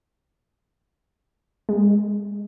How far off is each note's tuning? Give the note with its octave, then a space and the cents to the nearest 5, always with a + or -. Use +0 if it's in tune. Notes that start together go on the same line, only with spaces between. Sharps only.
G#3 -15